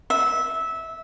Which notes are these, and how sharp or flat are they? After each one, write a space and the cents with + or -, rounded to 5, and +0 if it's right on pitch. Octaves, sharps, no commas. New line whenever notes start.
E5 -15